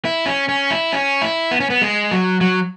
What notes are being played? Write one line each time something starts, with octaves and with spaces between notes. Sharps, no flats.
E4
C#4
C#4
E4
C#4
E4
B3
C#4
B3
G#3
F#3
F#3